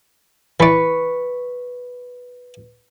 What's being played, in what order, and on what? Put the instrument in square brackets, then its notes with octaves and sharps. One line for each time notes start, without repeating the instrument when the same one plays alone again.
[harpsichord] E3 D5 [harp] B4 C#6